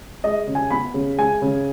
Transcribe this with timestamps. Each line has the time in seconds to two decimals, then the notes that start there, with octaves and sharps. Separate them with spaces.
0.24 G#3 D#5
0.47 C#3
0.55 G#5
0.71 B3 B5
0.94 C#3
1.18 G#3 G#5
1.42 C#3